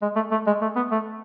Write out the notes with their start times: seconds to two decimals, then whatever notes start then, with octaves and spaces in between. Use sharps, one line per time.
0.02 G#3
0.16 A3
0.31 A3
0.47 G#3
0.61 A3
0.76 B3
0.91 A3